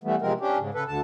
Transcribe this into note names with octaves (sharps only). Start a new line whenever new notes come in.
E3 G3 A3 B3
E2 C3 F3 G#3 C4 A#4
C#4 D4 G4
G#2 C#3
C#3 A4 B4
D2 D3 A5